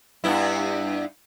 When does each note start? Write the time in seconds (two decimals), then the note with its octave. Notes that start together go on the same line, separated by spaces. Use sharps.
0.24 G2 B3 E4